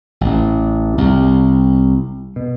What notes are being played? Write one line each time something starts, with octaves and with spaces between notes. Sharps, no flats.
A1
C2
B2